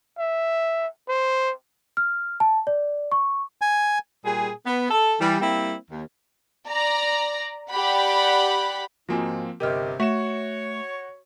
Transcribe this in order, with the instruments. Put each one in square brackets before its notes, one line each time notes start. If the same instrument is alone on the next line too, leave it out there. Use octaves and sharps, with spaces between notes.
[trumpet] E5
C5
[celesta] F6
A5
D5
C#6
[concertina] G#5
[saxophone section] A#2 G3 G#4
B3
A4
E3 G3
G3 A#3 C4 E4
D#2
[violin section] D5 A#5
G4 D5 F#5 B5
[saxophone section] G#2 D#4 [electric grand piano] F3 A#3 C4 [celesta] F4 F#4 G#5
[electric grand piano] G1 G4 [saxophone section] C3 [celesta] A#4 D#5 F6
[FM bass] A3 [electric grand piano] F#4 E7 [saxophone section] C#5 [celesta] E5